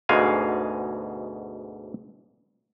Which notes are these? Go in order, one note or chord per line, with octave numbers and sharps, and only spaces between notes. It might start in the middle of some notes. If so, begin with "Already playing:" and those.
D2 G#2 B2 G#3 F5 G#5